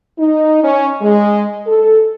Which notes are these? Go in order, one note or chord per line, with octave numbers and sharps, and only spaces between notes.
D#4
C#4
G#3
A4